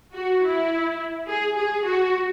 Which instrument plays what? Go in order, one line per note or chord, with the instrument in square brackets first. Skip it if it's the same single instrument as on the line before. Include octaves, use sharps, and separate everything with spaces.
[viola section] F#4
E4
G#4
G#4
F#4